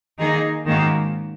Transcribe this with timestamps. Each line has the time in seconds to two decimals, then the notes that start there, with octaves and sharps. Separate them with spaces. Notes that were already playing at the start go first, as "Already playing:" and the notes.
0.18 D#3 A#3 D#4 G#4
0.66 G#2 D#3 A#3 C#4 F#4